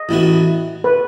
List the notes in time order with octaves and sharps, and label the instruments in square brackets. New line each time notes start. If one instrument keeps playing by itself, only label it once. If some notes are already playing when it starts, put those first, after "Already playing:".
Already playing: [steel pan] D#5
[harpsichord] A1 A2 E3 B3 F#4
[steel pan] B4